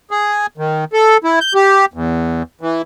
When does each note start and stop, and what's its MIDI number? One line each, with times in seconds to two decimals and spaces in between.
0.11 0.46 68
0.58 0.85 51
0.93 1.17 69
1.24 1.39 64
1.41 1.53 91
1.54 1.85 67
1.94 2.43 40
2.61 2.82 52